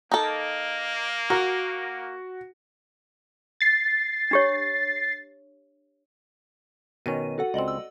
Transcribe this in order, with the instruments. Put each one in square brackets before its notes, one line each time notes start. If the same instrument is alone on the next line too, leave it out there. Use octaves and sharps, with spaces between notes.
[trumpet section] A#3 [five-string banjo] D#4 A4
[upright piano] F#4 [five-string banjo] A#4
[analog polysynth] A6 C7
[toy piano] D4 G4 C#5
[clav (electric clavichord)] B2 D#3 C#4 [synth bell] D#7
[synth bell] F#4 A4 F#5
[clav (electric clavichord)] C#2 C4 [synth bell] D5 D#5 F#7
[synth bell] E6